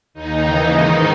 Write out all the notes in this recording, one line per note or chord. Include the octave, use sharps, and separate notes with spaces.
D#2 D#3 D#4
D#2 C#3 E3
G#2 D#3